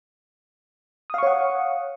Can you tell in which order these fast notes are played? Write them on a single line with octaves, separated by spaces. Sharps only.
D#6 F5 C#6 C#5 F#5